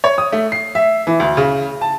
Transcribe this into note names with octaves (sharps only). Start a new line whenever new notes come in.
C#5
D#6
A3
C7
E5
E3
D2
C#3
A5